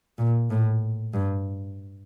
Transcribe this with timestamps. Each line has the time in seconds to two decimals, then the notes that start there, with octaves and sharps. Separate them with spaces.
0.18 A#2
0.50 A2
1.13 G2